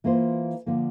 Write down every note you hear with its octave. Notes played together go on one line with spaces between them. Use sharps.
E3 A#3 F4 C5
D3 F3 A#3